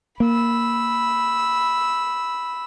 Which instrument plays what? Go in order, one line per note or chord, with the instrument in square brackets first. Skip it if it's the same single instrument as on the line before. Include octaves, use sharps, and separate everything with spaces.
[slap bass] A#3 [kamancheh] B5 E6